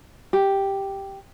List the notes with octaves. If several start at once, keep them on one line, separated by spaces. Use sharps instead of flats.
G4